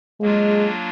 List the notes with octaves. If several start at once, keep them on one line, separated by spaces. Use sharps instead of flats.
F#3 G#3 A#3 D4 F4